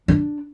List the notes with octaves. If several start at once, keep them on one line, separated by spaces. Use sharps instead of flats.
D4